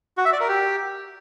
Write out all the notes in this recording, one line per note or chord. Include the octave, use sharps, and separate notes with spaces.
F#4
E5
D5
A#4
G4